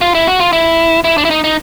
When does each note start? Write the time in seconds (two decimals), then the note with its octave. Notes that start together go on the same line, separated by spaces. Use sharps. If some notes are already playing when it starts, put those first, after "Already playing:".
0.01 F4
0.15 E4
0.27 F#4
0.40 F4
0.53 E4
1.04 E4
1.18 D4
1.25 E4
1.31 D#4
1.44 D#4